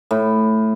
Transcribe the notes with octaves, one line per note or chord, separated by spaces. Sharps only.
A2